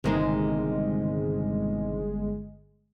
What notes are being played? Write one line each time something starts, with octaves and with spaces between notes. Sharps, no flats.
G1 C3 D#3 G#3 A#3